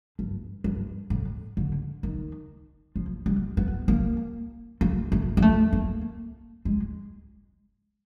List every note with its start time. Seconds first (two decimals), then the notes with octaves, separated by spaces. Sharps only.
0.19 G2
0.64 G2
1.10 A2
1.57 D3
2.03 D#3
2.96 F3
3.26 G3
3.57 B3
3.88 A#3
4.81 A3
5.12 A3
5.37 A#3
5.42 A3
5.73 A#3
6.65 G#3